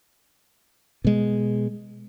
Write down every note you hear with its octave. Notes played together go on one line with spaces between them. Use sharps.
B2 G#3